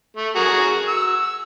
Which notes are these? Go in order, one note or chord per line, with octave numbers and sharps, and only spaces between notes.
A3
F#4 G#4 A#4
E6